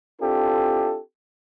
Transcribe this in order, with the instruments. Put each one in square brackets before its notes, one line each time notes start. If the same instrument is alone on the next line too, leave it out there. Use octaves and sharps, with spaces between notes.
[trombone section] C4 D4 E4 F4 G4 A4